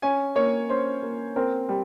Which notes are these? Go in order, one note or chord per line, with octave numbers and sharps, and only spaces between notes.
C#4 G#5
A#3 C#5
C#4 C5
A#3
C4 A#4
G3